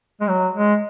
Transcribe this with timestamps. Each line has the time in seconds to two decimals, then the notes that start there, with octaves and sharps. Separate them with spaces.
0.20 G#3
0.28 F#3
0.55 G#3